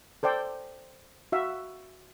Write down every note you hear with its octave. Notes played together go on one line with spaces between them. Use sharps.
A4 C5 D5 G5
F#4 E5 F5